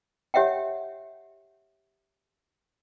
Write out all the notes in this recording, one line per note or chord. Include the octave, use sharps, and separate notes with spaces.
G4 C#5 E5 F#5 G5